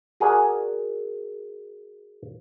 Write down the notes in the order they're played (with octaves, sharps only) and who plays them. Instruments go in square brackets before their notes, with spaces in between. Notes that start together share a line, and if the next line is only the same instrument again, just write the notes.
[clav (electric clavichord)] F#4 G#4 A#4 D5 F#5 G#5